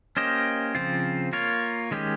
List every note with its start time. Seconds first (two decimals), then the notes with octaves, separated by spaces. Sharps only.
0.17 A#3 C#4 G4 C5 D#5
0.75 C#3 F3 C4 F4
1.33 A#3 F4 A#4 C#5
1.91 D#3 G#3 C#4 G4